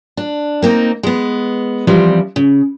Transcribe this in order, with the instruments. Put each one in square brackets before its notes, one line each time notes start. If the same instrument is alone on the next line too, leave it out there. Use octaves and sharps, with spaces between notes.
[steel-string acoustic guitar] D4
A#3 C4 D#4
G#3 B3
E3 F3 G3 C4
C#3